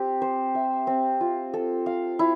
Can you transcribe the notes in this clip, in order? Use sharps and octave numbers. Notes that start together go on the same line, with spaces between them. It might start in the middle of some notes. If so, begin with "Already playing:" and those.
Already playing: C4 G4
C5
E5
C4
F4
A4
F5
E4